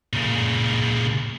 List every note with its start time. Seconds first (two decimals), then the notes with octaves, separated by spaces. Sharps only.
0.13 A#2 C#3